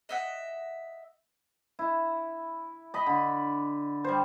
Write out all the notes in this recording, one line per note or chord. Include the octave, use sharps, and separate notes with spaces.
D#5 E5 F#5
E4
D#5 B5
D3
G3 C5